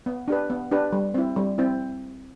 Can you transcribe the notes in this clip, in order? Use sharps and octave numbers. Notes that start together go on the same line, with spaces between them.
B3
D4 G4 B4
B3
D4 G4 B4
G3
C4 E4
G3
C4 E4